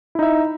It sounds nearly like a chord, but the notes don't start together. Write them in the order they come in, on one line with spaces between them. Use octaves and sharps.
E4 D#4 E5